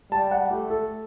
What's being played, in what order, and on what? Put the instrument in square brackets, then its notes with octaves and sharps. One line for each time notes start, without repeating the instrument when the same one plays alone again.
[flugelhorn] G3 [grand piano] A5
[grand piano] F#5
[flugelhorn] A3 [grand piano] G4
[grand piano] A4